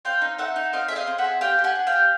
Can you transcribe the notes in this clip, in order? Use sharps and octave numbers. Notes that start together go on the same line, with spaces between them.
C4 F5 G5
D#4
D#4 E5 F#5
D#4
C4 D#5 F5
G#4 E5
D#5 F5
C4
E5 F#5
G#4
G4 F5 G5
G4
F#5 G#5
D4
F5 G5
G4